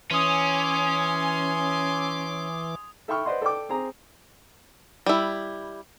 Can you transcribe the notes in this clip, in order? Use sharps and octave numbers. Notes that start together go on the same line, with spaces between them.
E3 C#4 G#5 C6 D6 D#6 F7
A4 E5 G5 B5 C#6 F6
B4 C5 D5 D#5 F#5 C6
A4 D5 G5 D6
C4 G#4 A#5
G3 E4